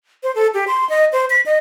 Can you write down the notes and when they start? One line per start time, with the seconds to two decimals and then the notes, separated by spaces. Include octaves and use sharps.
0.23 C5
0.35 A4
0.54 G4
0.67 C6
0.89 D#5
1.13 C5
1.30 B6
1.46 D#5